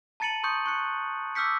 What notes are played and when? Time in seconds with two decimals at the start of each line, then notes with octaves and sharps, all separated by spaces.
0.20 A5 A#5 A6 C#7 D#7 F#7
0.43 C6 C#6 D#6 G6 C#7
0.66 C#6 F#6 C#7
1.35 D6 E6 F6 G6 B6 C#7